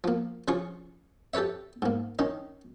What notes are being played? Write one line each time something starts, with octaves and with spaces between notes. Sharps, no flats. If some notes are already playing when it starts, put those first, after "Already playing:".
F3 A#3
C#3 F3 F4 G#4 C#6
G4 A4 B4 C#5 E5
G#2 A#3
D#3 C#4 D#4